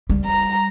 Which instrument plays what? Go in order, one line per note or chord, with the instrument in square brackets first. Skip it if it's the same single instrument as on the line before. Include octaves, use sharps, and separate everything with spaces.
[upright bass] G3
[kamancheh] A#5